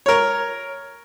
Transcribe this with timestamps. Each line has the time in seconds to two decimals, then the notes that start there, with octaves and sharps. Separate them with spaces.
0.06 A#4 C#5